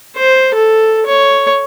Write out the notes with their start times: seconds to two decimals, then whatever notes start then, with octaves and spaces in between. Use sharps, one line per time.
0.16 C5
0.55 A4
1.07 C#5